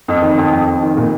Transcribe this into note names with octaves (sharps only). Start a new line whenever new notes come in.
F2
D#3
F2
F2
F2
D#3
A#2